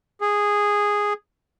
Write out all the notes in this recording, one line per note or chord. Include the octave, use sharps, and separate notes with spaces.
G#4